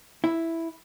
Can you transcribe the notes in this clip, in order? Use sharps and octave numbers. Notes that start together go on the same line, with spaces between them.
E4